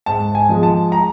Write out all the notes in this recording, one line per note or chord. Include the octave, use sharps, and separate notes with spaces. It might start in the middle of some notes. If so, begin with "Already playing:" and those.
G#2 A5
G#5
F3 G#3
A5
A#5